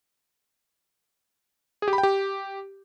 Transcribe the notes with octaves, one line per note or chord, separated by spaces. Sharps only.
G#4
G4
B5
G5
G4